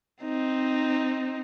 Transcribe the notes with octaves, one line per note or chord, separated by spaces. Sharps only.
C4 D#4